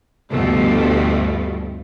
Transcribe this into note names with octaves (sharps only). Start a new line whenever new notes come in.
D2 G2 B2 F3 A3